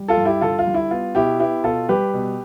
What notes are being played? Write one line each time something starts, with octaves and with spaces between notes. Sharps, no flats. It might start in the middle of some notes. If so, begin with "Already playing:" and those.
Already playing: G3
F4 A4
G2
E4 G4
D3 F4 A4
F4
G3
E4
B3 F4
B2 E4 G4
B3 E4 G4
B2 F4 A4
G3 G4 B4
B2